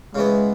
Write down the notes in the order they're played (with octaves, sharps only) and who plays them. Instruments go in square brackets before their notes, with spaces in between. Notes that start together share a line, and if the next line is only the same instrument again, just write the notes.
[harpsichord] C#3 E3 B3 [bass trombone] G#3